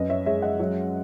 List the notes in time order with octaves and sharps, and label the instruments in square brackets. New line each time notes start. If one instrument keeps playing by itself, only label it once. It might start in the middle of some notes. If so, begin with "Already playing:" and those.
Already playing: [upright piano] F#2 B4 D#5
C#5 E5
G#3 C#5 E5
D#5 F#5
F#3